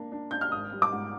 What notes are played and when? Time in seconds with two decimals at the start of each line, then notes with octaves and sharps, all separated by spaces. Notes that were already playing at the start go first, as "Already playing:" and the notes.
Already playing: A#3 D4
0.12 D4
0.31 D4 G6
0.41 F6
0.52 G#1 D#6
0.72 G3
0.82 D6
0.92 G#2